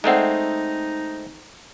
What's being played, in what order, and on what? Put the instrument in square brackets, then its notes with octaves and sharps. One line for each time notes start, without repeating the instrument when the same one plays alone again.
[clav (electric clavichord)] G#3 A3 C4 [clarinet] D#4 [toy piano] D5 F#5